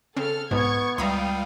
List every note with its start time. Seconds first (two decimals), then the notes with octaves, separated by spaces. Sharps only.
0.17 C#3 C4 A4 F6
0.51 B1 G#2 B3 C#6 G#6
0.98 C#2 G3 E5 F5 G5 A#5 B5 D#6